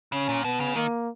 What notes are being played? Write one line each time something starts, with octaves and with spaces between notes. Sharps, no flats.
C#3 C#4
A#2
B2 B3
C#3
D#3 A#3